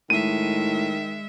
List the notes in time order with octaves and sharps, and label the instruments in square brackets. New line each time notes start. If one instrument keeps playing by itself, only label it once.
[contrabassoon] A2 [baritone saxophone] D#3 [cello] G#3 E5 [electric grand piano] D#7